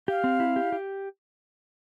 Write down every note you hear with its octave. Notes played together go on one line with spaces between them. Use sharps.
G4 F5
C4
E4
G4
G4